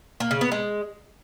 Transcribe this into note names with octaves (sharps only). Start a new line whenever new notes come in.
A#3
C#3
B3
G#3